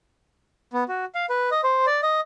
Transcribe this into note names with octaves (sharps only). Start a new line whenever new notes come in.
B3
F#4
F5
B4
D#5
C5
D5
D#5